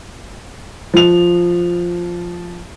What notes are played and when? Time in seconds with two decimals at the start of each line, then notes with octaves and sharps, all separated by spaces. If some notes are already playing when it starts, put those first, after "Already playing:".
0.94 F3 F7